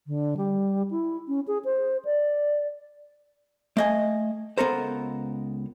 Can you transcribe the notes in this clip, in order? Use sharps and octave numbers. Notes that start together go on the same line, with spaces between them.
D3
G3
E4
C#4
G#4
C5
D5
A3 D#5 G#5
C#2 B3 A4 A#4 C5